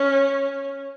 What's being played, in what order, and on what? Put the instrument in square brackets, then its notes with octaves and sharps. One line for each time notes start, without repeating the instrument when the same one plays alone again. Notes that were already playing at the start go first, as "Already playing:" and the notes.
Already playing: [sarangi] C#4